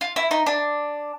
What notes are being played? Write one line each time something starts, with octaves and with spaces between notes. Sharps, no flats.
F4
E4
D#4
D4